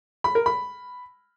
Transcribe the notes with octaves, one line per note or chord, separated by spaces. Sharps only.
B5
A#4
B5